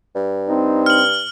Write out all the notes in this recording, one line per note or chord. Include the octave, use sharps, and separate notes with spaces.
G2
C4 D#4
F6 F#7